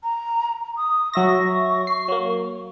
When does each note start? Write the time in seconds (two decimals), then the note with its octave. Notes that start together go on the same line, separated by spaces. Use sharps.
0.03 A#5
0.77 D#6
1.14 F#3 E5 C#6 A#6
1.87 C7
2.08 F#3 A#3